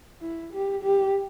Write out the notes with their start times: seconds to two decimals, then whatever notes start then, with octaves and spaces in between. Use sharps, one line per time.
0.22 E4
0.53 G4
0.83 G4